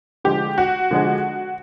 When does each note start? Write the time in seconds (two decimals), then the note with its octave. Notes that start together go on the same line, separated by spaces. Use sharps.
0.24 D3 F3 G#3 G4
0.58 F#4
0.91 D3 F3 G#3